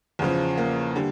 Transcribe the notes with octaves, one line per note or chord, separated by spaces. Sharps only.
E2 C#3 F3
A#3
D3 G3